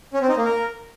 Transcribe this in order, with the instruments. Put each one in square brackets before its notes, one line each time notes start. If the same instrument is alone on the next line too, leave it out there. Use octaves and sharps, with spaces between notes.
[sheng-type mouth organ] C#4
C4
D#4
A#3
A#4